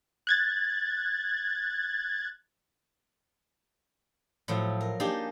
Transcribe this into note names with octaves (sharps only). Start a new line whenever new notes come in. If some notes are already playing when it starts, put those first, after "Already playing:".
F#6 G#6 A6
A2 F3 F#3
A#4
A#3 D4 D#4 G4 G#4